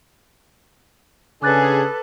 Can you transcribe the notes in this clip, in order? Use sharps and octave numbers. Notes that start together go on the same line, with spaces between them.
C#3 D4 G#4 A4 B4 D6 F#6 A6